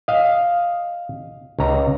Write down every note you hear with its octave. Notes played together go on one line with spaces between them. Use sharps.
D#5 F5
C#2 A#5